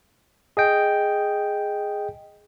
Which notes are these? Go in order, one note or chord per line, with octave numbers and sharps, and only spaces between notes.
G#4 D#5 G5